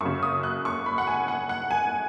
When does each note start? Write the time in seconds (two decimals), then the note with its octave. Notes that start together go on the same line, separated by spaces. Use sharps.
0.01 F#2 C#3 C#6
0.23 D#6
0.43 F#6
0.65 C#6
0.86 B5
0.98 F#5
1.07 G#5
1.28 F#5
1.49 F#5
1.71 G#5